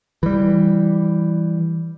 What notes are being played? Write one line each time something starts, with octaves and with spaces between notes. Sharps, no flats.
E3 G3